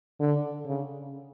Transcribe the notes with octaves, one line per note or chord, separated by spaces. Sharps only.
D3
C#3